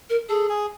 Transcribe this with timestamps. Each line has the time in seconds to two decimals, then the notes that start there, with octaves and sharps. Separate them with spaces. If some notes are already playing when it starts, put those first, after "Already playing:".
0.10 A#4
0.29 G#4 A4
0.49 G#4